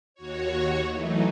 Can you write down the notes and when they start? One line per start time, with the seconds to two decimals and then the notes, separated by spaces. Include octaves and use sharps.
0.14 D#2 F#4 C#5
0.91 E3 F#3 A3 D#4